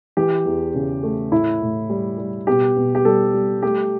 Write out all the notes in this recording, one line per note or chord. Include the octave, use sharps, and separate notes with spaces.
E3 G4
E2
C#3
A3
A2 E4
A2
G3
G3
B2 G4
B2
G4
G3 A4
G3
A3 G4